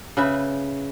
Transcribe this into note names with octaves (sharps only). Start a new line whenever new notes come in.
C#3 B4 E5